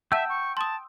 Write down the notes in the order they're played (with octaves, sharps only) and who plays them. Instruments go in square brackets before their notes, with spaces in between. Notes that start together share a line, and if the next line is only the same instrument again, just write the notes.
[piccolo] E5 [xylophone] F#5 A5 [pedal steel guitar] G5 E6 G6
[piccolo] C#6
[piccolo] A5 [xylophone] C6 D#6